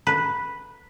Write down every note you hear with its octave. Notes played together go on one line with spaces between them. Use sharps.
B4